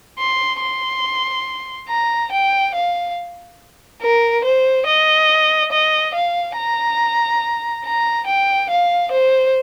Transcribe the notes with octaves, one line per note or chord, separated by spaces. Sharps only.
C6
C6
A#5
G5
F5
A#4
C5
D#5
D#5
F5
A#5
A#5
G5
F5
C5